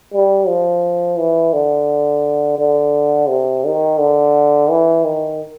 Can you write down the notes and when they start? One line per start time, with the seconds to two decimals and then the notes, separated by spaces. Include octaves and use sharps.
0.13 G3
0.48 F3
1.19 E3
1.53 D3
2.58 D3
3.28 C3
3.65 D#3
3.99 D3
4.70 E3
5.05 D#3